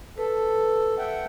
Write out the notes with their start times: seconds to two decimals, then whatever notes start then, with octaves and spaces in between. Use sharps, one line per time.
0.18 A4 B4
0.98 E5 F#5 G5